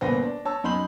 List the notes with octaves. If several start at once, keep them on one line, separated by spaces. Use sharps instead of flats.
G1 A#2 B3 B4 C5 A#6
D4
C#5 A5 E6
F#2 D#4 B5 C6 G6 F#7